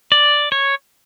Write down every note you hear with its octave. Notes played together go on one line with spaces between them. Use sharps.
D5
C#5